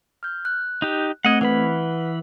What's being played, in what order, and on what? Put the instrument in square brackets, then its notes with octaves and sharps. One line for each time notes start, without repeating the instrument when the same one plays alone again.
[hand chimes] F6 G6
F#6
[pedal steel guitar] D#4 G4
[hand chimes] A3 C4 G#6 [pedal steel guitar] D#5 F#5
[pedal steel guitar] E3 B5 [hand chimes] B4 F#5